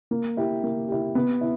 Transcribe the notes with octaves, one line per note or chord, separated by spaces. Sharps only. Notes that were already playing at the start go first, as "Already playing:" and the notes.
A#3
E4 G4
A#3
E4 G4
B3
E4